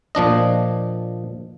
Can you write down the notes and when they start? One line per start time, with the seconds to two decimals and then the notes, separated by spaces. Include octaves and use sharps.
0.15 A#2 F3 D4 D#5